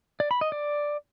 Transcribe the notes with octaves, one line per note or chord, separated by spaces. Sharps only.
D5
B5
D#5
D5